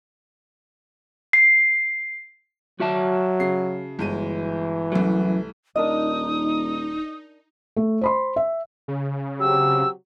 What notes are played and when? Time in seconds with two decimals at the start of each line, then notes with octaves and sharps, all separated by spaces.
1.33 C7
2.80 F#3 F#4 E5 A5
3.40 C#3 C7
3.99 G1 E3 G#3 D#7
4.92 C2 F#2 F#3 A3
5.76 D#1 D4 D#4 A#4 D#5 D#6
7.77 A3
8.01 C5 B5 C6
8.36 E5
8.88 C#3
9.40 C3 F#3 G4 E6